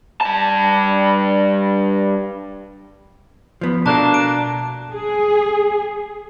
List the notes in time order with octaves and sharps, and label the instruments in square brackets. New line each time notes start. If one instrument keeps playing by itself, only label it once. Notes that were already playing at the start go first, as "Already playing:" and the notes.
[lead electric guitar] G2 A5
[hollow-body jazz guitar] F3 B3
[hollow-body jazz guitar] B2 [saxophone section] A3 A#3 D4 [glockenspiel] A5 A#5 F#6
[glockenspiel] D7
[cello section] G#4